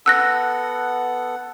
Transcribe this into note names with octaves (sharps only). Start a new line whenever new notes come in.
B3 A4 F#5 E6 F#6 A#6